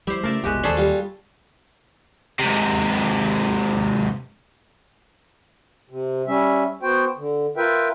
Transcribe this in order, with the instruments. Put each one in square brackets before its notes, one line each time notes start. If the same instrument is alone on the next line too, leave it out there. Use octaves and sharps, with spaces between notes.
[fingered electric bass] G3 [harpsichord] E4 C5 [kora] G4
[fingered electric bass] C#3 A3 [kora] A#4 D5 E5
[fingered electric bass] F#1 C2 B2 [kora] G#3 F#4 G4
[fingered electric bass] D#2 [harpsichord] D4 C5 B5 [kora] G#4 A4 C#5
[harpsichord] G3 F4
[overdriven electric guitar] G#2 C3
[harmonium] C3
G3 C#4 E5
B3 F#4 C5 G5
D3
F4 A#4 B4 E5 G5